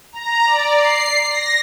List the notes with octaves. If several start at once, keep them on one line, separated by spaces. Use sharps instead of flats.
A#5
D5
C7
A#6